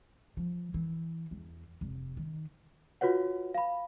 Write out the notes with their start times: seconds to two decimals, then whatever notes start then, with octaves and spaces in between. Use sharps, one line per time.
0.37 F3
0.74 E3
1.31 E2
1.81 F1
2.17 D#3
3.01 F4 F#4 B4 C#5 F#5
3.54 F5 B5